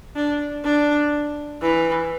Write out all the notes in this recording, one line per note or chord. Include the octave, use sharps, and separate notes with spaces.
D4
D4
E3